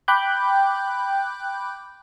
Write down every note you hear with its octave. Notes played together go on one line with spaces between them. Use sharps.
G5 B5 D6 F#6 G6